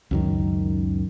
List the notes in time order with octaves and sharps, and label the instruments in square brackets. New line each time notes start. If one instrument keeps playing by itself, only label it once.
[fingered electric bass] C#2 F#2 D#3